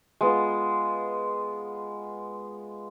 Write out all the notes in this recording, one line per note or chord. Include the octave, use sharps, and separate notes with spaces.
G#3 B3 F4